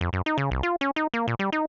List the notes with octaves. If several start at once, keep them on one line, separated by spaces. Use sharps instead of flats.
F2
F#2
D#4
C#3
C2
F4
C#4
D#4
A#3
A#2
G3
D#4